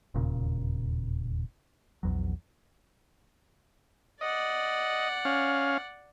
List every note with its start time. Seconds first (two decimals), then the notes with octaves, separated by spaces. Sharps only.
0.14 E1 D#2 A#2 C#3
2.03 A#1 E2 F#3
4.21 D5 D#5 F#5
5.25 C#4 F5